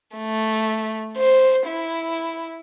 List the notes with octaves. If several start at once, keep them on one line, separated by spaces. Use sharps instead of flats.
A3
C5
E4